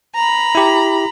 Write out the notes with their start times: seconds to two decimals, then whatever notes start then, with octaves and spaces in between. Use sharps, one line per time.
0.14 A#5 B5
0.55 E4 G4